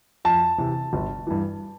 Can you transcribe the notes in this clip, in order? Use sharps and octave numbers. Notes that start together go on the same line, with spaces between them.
F2 A5
C3 E3
G1
G2 E3